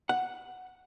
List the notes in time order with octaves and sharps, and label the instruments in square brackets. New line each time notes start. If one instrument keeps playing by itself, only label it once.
[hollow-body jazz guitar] F#5